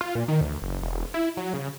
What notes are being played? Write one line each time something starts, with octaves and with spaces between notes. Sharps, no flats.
F4
A#2
D#3
D2
F#1
E1
E4
F#3
C#3